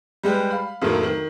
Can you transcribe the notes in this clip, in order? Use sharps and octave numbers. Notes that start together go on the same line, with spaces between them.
G3 G#3 G4 B4
F5 B5
F2 A2 D3 D#3 F#3 A#3
D#3